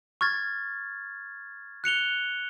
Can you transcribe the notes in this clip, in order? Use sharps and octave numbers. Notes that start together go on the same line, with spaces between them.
C#6 F6 G#6 A6
F#6 C#7 F7 G7